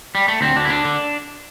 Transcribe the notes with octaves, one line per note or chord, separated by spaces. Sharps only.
G3
A3
D2 C4
D2 D4
E4
D3 D4
D3